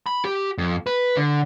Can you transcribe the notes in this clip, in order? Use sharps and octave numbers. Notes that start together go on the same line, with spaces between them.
B5
G4
F2
B4
D3